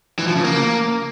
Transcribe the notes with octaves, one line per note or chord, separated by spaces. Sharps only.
E3
F3
C#3
A#3